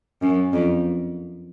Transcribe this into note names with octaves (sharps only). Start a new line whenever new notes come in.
F#2
F2